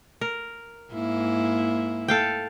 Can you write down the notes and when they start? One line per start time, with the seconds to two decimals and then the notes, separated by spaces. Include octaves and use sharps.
0.21 A#4
0.93 G#2 A#3 E4
2.08 A4 F5 G5